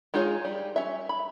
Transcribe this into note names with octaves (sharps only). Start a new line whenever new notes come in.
G#3 D#4 F4 G#4 C#5
G3
C#4 E5
B5